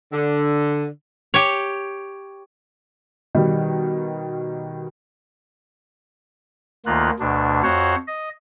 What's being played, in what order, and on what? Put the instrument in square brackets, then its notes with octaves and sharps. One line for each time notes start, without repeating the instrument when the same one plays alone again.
[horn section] D3
[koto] G4 C#5
[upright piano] B2 D#3 G3 D#4
[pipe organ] D2 D#3 A#3 F4 F#6
D2 B2 D4
F2 F#4 C5 C#5 F#5
D#5